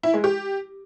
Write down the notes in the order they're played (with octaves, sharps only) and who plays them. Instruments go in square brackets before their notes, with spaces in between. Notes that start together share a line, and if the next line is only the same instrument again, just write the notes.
[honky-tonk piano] E4
G#3
G4